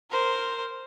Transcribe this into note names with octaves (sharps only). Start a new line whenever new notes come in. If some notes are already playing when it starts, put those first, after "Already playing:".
A#4 C5